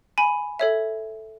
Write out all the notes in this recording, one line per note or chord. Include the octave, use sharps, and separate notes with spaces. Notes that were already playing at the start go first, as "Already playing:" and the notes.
G#5 B5
A4 C#5 E5